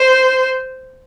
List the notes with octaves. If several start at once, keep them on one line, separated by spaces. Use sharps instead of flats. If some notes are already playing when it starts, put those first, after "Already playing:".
Already playing: C5